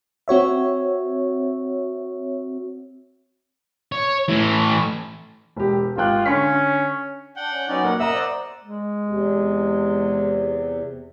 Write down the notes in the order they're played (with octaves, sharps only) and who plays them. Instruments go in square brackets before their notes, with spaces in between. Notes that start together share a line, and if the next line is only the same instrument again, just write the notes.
[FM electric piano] C4 F#4 C#5 E5
[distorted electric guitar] C#5
A2 E3
[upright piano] E1 G4
[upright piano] G#1 G5 F#6 [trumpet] F4
[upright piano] D3 C#6 B6 [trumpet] C#4
[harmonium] D4 [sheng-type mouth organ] F#5 G5
[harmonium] C#4
[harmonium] F#3 B3 [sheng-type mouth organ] C#4 D#4 D5
[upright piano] A#3 [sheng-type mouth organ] F#5
[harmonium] A#4 [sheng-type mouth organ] D#5 F#5 E6 [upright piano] E5 A#5
[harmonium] C5 D5
[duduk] G#3
[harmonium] E2 C3